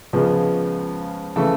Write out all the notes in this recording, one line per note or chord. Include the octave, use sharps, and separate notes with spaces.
C#2 C#3 F3 G#3 B3 G#4
C#3 E3 A3 A4